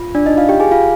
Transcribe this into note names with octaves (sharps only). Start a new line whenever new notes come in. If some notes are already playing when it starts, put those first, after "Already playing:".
Already playing: F4
D4 D5
D#4 D#5
F4 F5
G4 G5
G#4 G#5
F4 F5